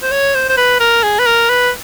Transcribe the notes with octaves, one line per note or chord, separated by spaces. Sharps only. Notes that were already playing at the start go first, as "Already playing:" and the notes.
C5
C#5
C5
C5
B4
A#4
G#4
B4
A#4
B4